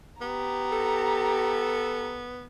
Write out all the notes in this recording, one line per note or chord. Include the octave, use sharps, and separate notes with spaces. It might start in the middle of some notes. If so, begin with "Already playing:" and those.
B3 G4 A#5
A4